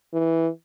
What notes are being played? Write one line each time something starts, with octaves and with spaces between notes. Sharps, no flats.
E3